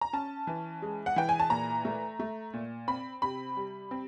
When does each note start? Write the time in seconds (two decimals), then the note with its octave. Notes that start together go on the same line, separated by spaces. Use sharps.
0.01 A#5
0.13 C#4 A5
0.47 E3
0.82 G#3
1.06 F#5
1.16 E3 G5
1.29 G#5
1.40 A5
1.50 A#2 A#5
1.85 A3
2.20 A3
2.53 A#2
2.88 C4 B5
3.22 C3 B5
3.57 G3
3.91 C4